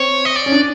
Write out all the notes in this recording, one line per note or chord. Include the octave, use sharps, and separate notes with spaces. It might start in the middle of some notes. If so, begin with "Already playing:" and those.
Already playing: C4 C#5
D#5
D5
C#4
D4